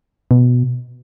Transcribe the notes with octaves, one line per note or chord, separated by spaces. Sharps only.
B2